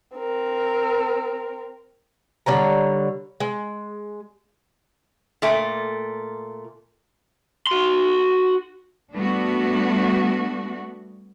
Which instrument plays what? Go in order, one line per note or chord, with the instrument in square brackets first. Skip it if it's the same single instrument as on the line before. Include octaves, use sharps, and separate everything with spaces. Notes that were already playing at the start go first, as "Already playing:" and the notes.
[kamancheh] C4 A#4
[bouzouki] D3 G3 C#5 A#5
G#3
[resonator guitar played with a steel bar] A#2 A3
[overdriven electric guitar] F#4 C6
[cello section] G3 A3 B3 D4 F#4